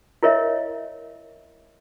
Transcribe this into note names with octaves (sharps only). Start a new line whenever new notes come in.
E4 A#4 C#5 D#5 E5